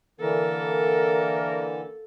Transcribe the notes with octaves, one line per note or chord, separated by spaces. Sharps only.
D3 E3 A#3 A4 A#4